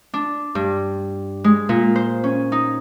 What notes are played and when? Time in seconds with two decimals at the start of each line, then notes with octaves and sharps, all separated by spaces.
0.14 D4
0.55 G2
1.44 G#3
1.69 A#2
1.96 C5
2.24 C#4
2.52 D#4